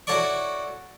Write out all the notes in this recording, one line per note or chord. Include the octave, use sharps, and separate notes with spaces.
E4 F#4 A4 C#5 D5 C#6